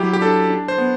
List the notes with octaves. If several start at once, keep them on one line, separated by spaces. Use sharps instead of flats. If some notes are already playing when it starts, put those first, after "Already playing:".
Already playing: F#3 E4 G4
G4
D4 A4
D4
C5
B3